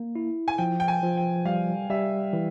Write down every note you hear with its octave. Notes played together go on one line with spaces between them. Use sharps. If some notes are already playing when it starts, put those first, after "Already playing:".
Already playing: A#3
E4
G#5
F3 G5
G5
G#5
F3
G5
G3 F5
G3 E5
E3